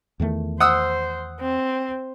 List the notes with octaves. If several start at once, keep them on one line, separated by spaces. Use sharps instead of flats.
E2 D#3 A3
C5 F#5 D#6 E6
C4